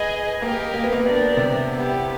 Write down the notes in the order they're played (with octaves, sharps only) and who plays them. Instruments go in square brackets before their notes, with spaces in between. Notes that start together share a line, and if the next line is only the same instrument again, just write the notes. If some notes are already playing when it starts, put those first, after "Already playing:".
Already playing: [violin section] G#4 B4 D#5 G#5
[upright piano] A#3 [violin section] G4 A#4 D#5
[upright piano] A#3
B3
A#3
[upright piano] B3 [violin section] D4 G4 A#4 D5
[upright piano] C3 C4
[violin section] B3 E4 G4